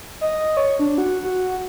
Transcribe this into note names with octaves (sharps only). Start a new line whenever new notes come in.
D#5
C#5
D4
F#4
F#4